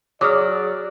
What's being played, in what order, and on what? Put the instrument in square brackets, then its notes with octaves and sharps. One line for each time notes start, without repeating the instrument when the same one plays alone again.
[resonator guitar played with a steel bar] F#3 [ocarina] G#4 [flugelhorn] D5 [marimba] D6 D#6 F6